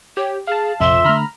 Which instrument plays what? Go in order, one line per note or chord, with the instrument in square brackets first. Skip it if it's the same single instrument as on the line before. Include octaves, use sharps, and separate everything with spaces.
[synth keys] G4 [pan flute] C#5
[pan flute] G#4 [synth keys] F5 A5
[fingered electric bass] A#1 C3 [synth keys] F2 E7 [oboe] E5 [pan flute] C6
[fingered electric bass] D3 A3 [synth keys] A#5 B5 F6